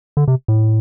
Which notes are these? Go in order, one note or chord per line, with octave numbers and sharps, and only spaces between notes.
D3
C3
A2